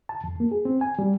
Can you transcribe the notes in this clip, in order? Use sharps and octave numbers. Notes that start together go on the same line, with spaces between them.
A5
F2
A#3
G#4
C4
G#5
G3